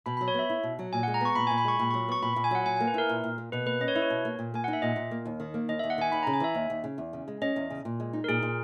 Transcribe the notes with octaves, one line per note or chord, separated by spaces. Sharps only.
B2 B5
B5
F#3
C#5
B3 E5
E4
B2
F#3
A#2 G#5
F#5
G#3
A#5
B3 C#6
A#2 B5
G#5
A#2
B5
G#3 C#6
A#2 B5
C#6
F#3
B3 C#6
A#2 B5
B5
A#2
G#5
F#3 F#5
A#2 G#5
G#5
A#3
B4
E4 A#4
A#2
A#2
A#3
B2 B4
A#3 B4
C#4 D#5
C#5
E4 B4
C#5
B2
A#3
A#2
A#3 G#5
D#4 F#5
E5
A#2 D#5
A#2
A#3
D#2
D#3
A#3
D#2 D#5
E5
D#2
F#5
D#3 G#5
D#2 B5
A#5
C#3
G#5
E3 E5
D#2
D#2
C#3
E2
C#3
G#3
C#4 D#5
E2
C#3
A#2
G#3
D#4
A#4
A#2 G#4
A#2